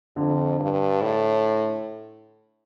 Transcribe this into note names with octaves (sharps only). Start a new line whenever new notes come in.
F2 D3
G2
A2